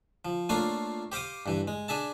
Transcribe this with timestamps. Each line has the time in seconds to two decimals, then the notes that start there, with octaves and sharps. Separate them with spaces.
0.25 F3
0.49 A3 A#3 D4 F4 C#5 F5
1.12 G4 C5 F5 D6 D#6
1.46 G2 E3
1.68 G#3
1.88 D4 G#4 E5 A5